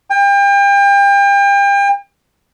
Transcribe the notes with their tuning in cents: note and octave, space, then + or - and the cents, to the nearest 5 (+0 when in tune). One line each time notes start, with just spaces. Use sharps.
G5 +35